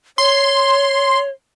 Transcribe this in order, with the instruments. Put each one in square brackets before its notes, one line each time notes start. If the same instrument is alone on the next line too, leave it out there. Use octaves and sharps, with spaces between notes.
[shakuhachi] C#5 [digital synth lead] C6